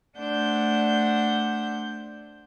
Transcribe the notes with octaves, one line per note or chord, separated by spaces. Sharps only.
A3 D4 C5 F#5 G6